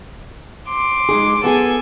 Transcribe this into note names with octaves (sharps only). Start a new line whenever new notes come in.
C6 D6
G#3 D#4 G#4
B3 G#4 A4 G#5